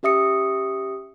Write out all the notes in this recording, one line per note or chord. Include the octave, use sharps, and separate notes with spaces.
C#4 G4 E5 D#6 C#7